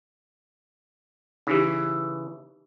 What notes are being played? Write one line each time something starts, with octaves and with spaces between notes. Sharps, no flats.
C#3 E3 D#4 G4